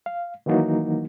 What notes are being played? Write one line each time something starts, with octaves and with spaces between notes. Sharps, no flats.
F5
D#3 E3 F#3 A#3 D#4 F#4